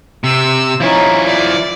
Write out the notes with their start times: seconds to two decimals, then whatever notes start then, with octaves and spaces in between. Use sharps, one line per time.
0.24 C3 E6
0.80 F3 C#4 D#4 E4
1.25 D5